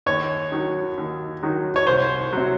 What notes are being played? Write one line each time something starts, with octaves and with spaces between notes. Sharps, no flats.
D#2 C#5
D#3 F#3
D#2
D#3 F#3
C#5
C2 C5
C3 F#3